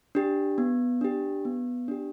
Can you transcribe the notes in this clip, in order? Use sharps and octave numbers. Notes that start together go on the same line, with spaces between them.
D4 G4
B3
D4 G4
B3
D4 G4